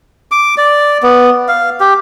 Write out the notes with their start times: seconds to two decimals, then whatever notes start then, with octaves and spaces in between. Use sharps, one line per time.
0.31 D6
0.57 D5
1.03 B3
1.48 F5
1.80 G4